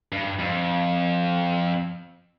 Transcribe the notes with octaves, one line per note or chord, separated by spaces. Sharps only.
G2
F2